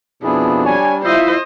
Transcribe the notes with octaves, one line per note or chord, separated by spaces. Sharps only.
F2 B2 B3 D4 E4 G#4
G3 C#5 G#5
E4 F4 C5 D#5 E5